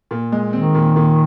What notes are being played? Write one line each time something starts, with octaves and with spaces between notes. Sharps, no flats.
A#2
G#3
D#3 C4
A#2
A#2